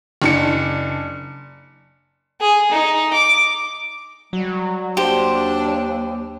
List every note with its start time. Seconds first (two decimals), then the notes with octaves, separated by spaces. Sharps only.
0.22 F#1 D4 C#7
2.40 G#4
2.71 D#4
3.13 D6
4.33 F#3 G3
4.97 D#2 D4 G4 C5